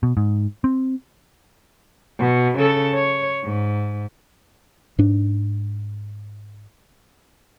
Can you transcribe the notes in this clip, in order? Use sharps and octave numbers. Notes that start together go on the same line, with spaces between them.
B2
G#2
C4
B2
C#3 A4
C#5
G#2
G#2 D4